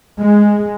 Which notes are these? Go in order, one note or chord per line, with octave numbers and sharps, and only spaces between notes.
G#3